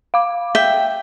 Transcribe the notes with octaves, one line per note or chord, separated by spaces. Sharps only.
F5 D6
E5 G5